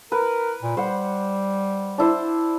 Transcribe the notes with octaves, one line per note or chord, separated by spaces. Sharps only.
A#4 B4
A#2
G3 C5 F#5
D4 E4 C5